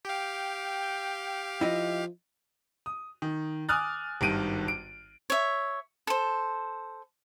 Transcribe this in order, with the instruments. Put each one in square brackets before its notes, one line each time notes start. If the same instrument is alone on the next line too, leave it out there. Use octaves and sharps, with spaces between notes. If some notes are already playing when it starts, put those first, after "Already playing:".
[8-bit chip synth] G4 F5 [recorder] G5
[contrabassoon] F3 [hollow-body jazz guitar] E4 D#5
[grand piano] D#6
D#3
G#5 D6 D#6 F6 F#6 A6
G#1 G2 D#3 D7 D#7
D7
[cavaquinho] C#5 E5
A4 C5